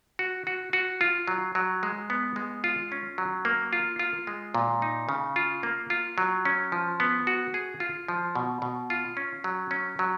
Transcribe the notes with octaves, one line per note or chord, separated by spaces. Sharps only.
F#4
F#4
F#4
F4
F#3
F#3
G#3
B3
G#3
F4
C#4
F#3
A#3
F4
F4
G#3
A#2
D#4
C#3
F4
A#3
F4
F#3
C#4
F3
B3
F#4
G#4
F4
F3
B2
B2
F4
C#4
F#3
C#4
F#3